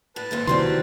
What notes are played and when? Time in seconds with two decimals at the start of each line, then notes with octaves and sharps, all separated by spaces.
0.16 A2 B4 A5
0.31 D#2 G#2 E3
0.47 C3 D#3 E3 F#3 G3 C4 C6